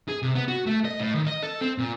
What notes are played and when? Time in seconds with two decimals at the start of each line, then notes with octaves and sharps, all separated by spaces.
0.09 G#4
0.22 C3
0.35 B3
0.48 F#4
0.66 A3
0.85 D#5
1.00 A2
1.15 D#3
1.26 D#5
1.42 A4
1.61 C4
1.78 A#2